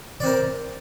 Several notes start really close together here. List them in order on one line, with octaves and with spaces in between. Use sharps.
D5 C4 A#4